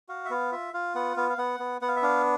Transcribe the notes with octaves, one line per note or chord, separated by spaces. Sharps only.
F#4 F5
E5
B3 F5
F4 E5
F4 F5
B3 F#5
B3 F5
F5
B3 F#5
B3
B3 F#5
F5
E5
D4 F5